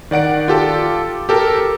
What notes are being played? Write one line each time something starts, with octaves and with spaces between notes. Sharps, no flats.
D#3 D5 F#5 D7
F4 G4 A4
G4 A4 A#4